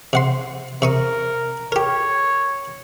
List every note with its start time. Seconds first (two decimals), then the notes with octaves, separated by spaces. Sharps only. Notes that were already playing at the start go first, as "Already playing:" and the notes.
0.13 C3 F#5 C6
0.82 C3 A#4 C#6 D#6
1.72 G4 A#4 C#5